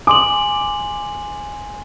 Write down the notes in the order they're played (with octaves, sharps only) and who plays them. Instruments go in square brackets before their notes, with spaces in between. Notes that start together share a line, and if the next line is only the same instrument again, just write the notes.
[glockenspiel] G#5 C6 F#7 [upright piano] D6